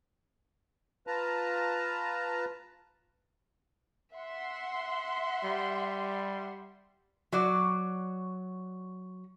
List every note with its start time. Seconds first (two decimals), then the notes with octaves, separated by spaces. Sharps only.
1.07 F4 B4 A5 A#5
4.14 E5 F#5 C6
5.44 G3
7.32 F#3 F#4 D5